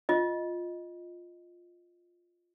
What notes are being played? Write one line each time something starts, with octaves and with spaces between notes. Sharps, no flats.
F4 D#5